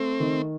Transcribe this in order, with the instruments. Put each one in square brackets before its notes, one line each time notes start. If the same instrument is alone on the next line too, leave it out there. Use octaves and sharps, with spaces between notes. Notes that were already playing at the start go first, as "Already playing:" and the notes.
Already playing: [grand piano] A3 [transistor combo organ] C4
[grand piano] D#3